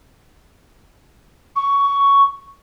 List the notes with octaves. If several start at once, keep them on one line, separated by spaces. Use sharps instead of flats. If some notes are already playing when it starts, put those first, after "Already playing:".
C#6